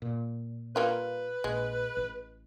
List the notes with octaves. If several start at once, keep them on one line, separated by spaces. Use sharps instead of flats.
A#2
G3 A#3 F4 B4
A#1 G#3
A1